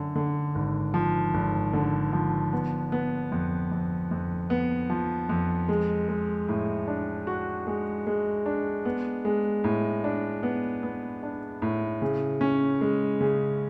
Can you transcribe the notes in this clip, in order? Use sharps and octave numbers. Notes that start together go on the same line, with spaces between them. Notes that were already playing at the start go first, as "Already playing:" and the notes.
Already playing: F#2 D3
D3
G#1
F3
G#1
D3
F3
B3
B3
F2
F2
F2
B3
F3
F2
G#3
G#3
A2
D4
F#4
G#3
G#3
D4
B3
G#3
A2
D4
B3
B3
D4
A2
C#3
C#4
G#3
C#3